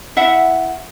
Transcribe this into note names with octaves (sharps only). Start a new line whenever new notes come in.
E4 E5 F#5